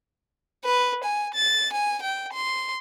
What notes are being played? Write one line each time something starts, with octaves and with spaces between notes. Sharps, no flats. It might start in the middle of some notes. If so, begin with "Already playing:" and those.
B4
G#5
A6
G#5
G5
C6